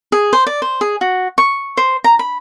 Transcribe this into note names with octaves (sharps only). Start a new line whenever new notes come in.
G#4
C5
D5
C5
G#4
F#4
C#6
C5
A#5
B5